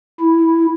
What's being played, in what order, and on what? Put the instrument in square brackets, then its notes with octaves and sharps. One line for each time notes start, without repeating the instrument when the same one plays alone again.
[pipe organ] E4